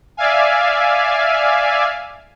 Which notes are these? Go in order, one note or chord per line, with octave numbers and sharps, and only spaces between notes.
D5 E5 F5 G#5